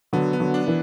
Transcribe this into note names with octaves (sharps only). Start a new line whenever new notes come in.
D3 F#3 B3
B3
D3 F#3
D4
E3